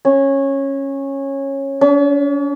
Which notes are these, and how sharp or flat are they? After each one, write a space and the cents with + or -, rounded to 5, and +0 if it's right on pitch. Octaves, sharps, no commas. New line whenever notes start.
C#4 -15
C#4 +45